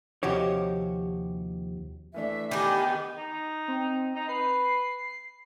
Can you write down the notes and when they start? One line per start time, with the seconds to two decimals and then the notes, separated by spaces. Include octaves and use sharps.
0.23 D#2 C3 F3 F#4 G4 C#5
2.14 E3 A3 D4 E5
2.51 D#3 B3 G4 G#5 B5 D6
3.18 D#4
3.68 C4
4.15 D#4
4.28 B4 C7